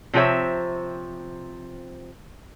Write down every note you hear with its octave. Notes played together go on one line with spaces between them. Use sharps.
C3 F3 C4 G4 C#5 E5